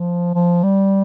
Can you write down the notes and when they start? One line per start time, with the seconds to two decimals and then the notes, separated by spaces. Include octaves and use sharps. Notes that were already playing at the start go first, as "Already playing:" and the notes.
Already playing: F3
0.35 F3
0.63 G3